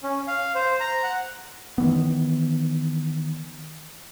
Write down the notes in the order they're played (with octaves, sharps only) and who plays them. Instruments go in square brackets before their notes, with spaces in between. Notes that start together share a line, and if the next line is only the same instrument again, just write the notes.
[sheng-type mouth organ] C#4
F5
C5
A#5
F#5
[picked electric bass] D#3 E3 B3